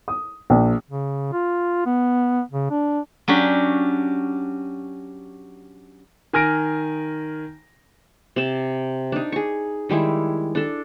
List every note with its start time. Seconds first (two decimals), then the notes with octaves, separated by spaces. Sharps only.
0.08 D#6
0.50 A#1
0.89 C#3
1.33 F4
1.86 B3
2.51 C#3
2.70 D4
3.28 F#3 C#4 D4 G4
6.33 D#3 G#5 F6 A#6 D7
8.36 C3 A5
9.12 D4 D#4
9.32 G#4 C#6
9.89 D#3 G3 G#3 E4
10.55 D4 A4